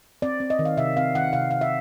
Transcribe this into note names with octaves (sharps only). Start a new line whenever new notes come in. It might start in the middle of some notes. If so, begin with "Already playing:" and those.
C4 D5
C4
D#5
D#3
F5
C3 E5
C4 F5
D#3 F#5
C3 F5
C3 F5
E5